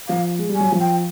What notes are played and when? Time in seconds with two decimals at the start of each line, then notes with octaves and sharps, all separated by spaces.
0.08 F3 F5
0.38 G#3
0.49 G3
0.55 F#3 G#5
0.72 F3
0.80 G5